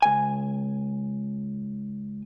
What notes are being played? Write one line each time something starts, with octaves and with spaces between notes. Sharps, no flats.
C#2 G#5